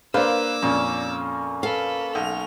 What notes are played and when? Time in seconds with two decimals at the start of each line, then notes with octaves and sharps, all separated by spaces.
0.14 A#3 D4 B4 C5 F5 D6 E6
0.62 F2 A#2 C#4
1.63 A4 B4 F5
2.15 B1 F7